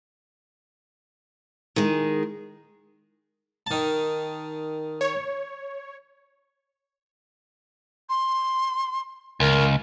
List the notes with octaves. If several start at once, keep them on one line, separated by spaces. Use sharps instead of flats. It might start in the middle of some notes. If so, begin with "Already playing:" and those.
D#3 G#3
D#3 A5
C#5
C6
C#2 A#4